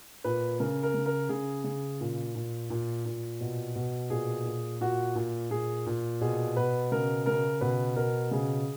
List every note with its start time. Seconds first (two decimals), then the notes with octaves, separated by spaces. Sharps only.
0.24 A#2 B4
0.60 C#3 A#4
0.83 A#4
0.94 C#3
1.06 A#4
1.29 C#3 G#4
1.64 C#3 G#4
2.01 A#2
2.35 A#2
2.70 A#2
3.06 A#2
3.41 B2
3.75 B2
4.10 A#2 G#4
4.45 A#2
4.81 A#2 F#4
5.15 A#2
5.51 A#2 G#4
5.86 A#2
6.21 B2 G#4
6.57 B2 B4
6.92 C#3 A#4
7.26 C#3 A#4
7.61 B2 B4
7.96 B2 A#4
8.31 C#3 G#4